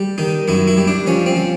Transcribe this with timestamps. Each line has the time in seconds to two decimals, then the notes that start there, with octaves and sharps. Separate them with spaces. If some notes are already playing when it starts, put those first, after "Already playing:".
Already playing: G3
0.18 D#3 D#4
0.48 F#2 E4
0.68 E4
0.77 G3
0.88 D4
1.07 F3 C#4
1.26 C4
1.36 F3